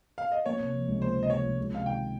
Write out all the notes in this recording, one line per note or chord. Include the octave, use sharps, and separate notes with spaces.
F5
D#5
A#3 C#5
C3
F3
C#2
A#3 C5
C3
D#5
F3 C#5
C#2
G#3
C3 F5
D#3 G5